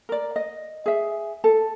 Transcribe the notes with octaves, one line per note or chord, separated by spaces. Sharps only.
A#4 D5
D#5
G#4 E5
A4